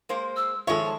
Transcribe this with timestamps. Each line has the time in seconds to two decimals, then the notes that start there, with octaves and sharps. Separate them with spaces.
0.09 G#3 A#3 C5
0.36 E6
0.67 D#3 F3 G#3 F4 A4 C#5 E5
0.84 A5